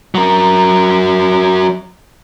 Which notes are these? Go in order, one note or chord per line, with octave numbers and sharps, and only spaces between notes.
F#3 A#4